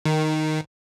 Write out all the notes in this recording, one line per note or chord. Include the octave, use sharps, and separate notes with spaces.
D#3